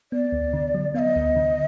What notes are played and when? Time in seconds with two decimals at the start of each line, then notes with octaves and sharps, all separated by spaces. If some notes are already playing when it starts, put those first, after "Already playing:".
0.12 B3 D5
0.32 D2
0.53 D3
0.75 F#3
0.94 B3 F5
0.99 D#5
1.16 D2
1.36 D3